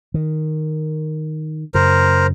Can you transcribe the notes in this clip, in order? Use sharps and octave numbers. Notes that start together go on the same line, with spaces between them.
D#3
F#2 C#3 A#4 C5